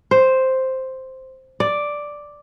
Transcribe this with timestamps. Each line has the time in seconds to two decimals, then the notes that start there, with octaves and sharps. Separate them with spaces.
0.11 C5
1.60 D5